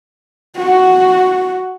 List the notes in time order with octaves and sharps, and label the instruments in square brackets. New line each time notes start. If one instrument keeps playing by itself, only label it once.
[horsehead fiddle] F#4